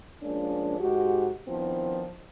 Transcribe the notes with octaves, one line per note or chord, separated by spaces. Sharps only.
F3 G#3 A#3 C#4 D4
G#2 F#4 G4
D#3 F3 B3 C4 D4 E4